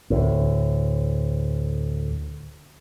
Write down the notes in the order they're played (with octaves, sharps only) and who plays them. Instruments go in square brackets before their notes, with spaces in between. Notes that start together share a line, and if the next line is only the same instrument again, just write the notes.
[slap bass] D2 A2